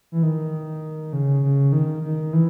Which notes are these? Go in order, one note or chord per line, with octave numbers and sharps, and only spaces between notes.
E3
D#3
C#3
C#3
D#3
D#3
E3